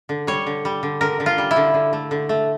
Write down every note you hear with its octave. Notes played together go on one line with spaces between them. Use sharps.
D3
G3 C#5
D3
G3
D3
D3 A#4
D3
F4
G3
E4
D3
D3
A3
D3
A3